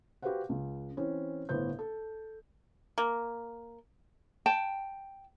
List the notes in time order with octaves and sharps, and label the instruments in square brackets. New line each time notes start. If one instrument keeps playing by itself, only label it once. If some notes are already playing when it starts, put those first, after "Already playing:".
[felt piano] F#4 G4 B4 C5 F5 F#5
C#2
E3 C4 C#4
G1 A2 B3 C5 G6
A4
[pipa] A#3
[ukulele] G5 A5